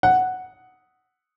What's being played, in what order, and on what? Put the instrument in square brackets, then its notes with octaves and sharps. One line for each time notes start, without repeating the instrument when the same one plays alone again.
[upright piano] F#5